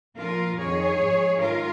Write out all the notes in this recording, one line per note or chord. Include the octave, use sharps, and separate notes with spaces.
A#2 F3 F4 A#4
F2 D#3 G#4 C#5
G#2 F3
G#2 D#3 F4 A#4